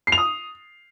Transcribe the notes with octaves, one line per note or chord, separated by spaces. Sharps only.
C7
F7
D#6